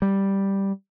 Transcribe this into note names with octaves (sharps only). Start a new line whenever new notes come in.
G3